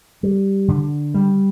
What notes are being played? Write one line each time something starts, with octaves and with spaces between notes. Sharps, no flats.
G3
D3
G3